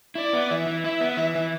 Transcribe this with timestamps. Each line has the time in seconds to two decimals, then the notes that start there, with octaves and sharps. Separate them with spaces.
0.15 E4 D5
0.33 B3
0.50 E3 E5
0.67 E3
0.84 E4 E5
1.01 B3
1.17 E3
1.35 E3